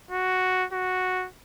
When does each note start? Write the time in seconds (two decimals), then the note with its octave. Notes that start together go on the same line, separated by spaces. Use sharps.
0.11 F#4
0.73 F#4